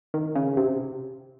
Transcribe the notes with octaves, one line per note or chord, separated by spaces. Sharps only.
D#3
C#3
C3